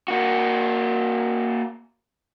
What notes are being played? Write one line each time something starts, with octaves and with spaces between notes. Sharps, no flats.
A#3 F#4